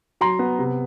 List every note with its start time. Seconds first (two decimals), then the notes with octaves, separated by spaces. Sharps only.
0.21 F#3 A#5 C6
0.39 B3
0.59 C3